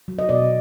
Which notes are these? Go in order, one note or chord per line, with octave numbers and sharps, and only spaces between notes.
F#3
D#5
B2 D5